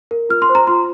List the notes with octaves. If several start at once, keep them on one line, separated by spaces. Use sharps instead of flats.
A#4
F4 F6
C6
C5
A#5
F4 C6